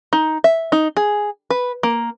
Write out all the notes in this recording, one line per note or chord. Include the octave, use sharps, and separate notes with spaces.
D#4
E5
D#4
G#4
B4
A#3